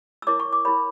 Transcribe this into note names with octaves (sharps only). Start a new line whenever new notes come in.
E6
E4 A#4 C#5 D6
C#6
D6
E4 A#4 C#5 B5